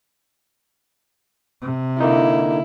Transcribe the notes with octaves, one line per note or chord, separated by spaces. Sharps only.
C3
D3 A#3 D#4 E4